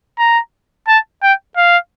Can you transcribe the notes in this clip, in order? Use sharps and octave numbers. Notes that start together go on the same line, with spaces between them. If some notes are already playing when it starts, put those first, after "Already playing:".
A#5
A5
G5
F5